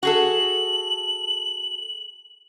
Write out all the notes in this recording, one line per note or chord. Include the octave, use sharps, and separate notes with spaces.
F#4 G#4 A4 F#7